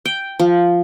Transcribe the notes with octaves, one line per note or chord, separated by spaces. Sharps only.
G5
F3